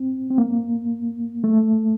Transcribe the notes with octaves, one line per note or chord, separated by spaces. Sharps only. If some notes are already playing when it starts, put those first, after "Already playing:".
Already playing: C4
C4
A#3
A3